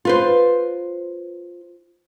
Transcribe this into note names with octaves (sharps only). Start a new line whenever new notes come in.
F4 B4 C5